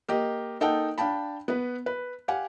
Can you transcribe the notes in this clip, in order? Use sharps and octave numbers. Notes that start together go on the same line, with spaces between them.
A#3 G4 D#5
A#3 D#4 A4 F#5 G5 A5
D4 F5 G5 A5 B5
B3 B4
B4
G4 F5 F#5 G#5